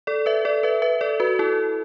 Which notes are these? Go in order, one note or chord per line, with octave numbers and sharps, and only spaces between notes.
A4 D5
B4 E5
A4 D5
B4 E5
B4 E5
A4 D5
F#4 B4
E4 A4